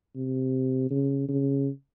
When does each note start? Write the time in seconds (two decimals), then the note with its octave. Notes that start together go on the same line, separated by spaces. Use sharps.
0.15 C3
0.90 C#3
1.28 C#3